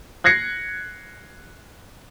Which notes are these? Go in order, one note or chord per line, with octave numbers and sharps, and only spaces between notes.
F#6 G#6 A#6 C7 C#7